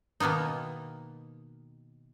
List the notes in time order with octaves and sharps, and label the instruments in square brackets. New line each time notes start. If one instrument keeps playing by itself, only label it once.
[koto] B2 D#3 A#3 B3 D#4